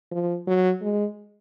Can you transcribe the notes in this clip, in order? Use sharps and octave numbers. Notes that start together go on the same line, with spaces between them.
F3
F#3
G#3